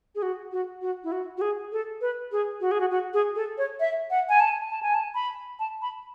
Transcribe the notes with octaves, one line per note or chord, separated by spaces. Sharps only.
G#4
F#4
F#4
F#4
E4
F#4
F#4
G#4
A4
B4
G#4
F#4
G#4
F#4
F#4
G#4
A4
C#5
E5
F#5
G#5
A5
A5
G#5
A5
B5
A5
B5